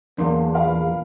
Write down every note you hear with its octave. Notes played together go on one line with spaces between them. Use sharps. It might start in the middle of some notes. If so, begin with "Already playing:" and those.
E2 F#3 A#3 B3 D4 C6
A#2 A#4 F5 B5